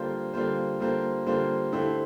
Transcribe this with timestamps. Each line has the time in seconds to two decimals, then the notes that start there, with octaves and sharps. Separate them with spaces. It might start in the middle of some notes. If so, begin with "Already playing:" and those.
Already playing: D3 G3 A#3 F4 C5
0.34 D3 G3 A#3 F4 C5
0.80 D3 G3 A#3 F4 C5
1.26 D3 G3 A#3 F4 C5
1.72 D3 A3 E4 G4 C5